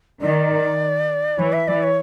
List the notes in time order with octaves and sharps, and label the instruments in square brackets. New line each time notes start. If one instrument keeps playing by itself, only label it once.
[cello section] D#3 [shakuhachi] D5
[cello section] E3 [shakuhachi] C#5
[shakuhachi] E5
[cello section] E3 [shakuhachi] D5
[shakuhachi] C#5